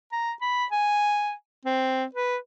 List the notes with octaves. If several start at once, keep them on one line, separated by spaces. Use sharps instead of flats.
A#5
B5
G#5
C4
B4